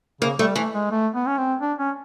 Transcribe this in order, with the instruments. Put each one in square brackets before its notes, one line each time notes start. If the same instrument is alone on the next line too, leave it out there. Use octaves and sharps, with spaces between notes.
[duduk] C#3 [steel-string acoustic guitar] A#3
[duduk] G3 [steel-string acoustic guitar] A3
[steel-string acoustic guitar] E3 [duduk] A3
[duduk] G#3
A3
B3
C#4
C4
D4
C#4